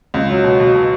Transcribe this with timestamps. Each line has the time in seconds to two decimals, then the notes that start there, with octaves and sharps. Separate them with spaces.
0.14 C#2
0.29 F#3
0.44 B2
0.60 B2
0.75 B2